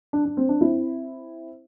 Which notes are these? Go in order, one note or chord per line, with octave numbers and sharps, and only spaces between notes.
D4
D4
C4
D4
C4 E4